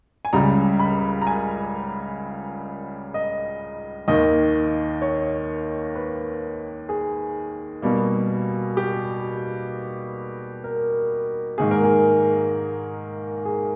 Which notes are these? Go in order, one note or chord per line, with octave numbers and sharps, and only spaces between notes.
G#5
C#2 C#3 G3 A#5
B5
A#5
G#5
D#5
D#2 D#3 A#3 D#5
C#5
B4
G#4
B2 G3 A#3
G4
A#4
G#2 D#3 A#3 G#4
A#4
G#4
G#4